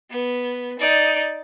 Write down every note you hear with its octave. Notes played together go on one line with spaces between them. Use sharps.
B3
D#4 D5